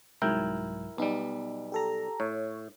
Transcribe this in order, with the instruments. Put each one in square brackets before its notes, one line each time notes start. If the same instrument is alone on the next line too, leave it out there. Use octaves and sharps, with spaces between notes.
[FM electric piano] C2 G#2 F#3 [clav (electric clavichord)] E4 A#4 G5
[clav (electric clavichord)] B1 G3 [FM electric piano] B3 D#4
[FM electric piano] G4 A4 A#5
[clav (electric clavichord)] A2 [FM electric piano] C#5